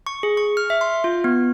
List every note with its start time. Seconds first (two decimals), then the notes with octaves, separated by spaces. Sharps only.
0.06 C#6
0.23 G#4
0.37 C#6
0.57 F6
0.70 E5
0.81 C6
1.04 F4
1.24 B3